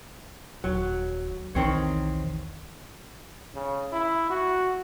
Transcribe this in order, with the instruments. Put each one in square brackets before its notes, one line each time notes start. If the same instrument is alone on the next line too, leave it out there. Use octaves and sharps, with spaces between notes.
[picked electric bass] D#1 [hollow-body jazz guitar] F#3
[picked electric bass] B1 E2 [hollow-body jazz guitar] D#3 C4 C#5
[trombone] C#3
E4
F#4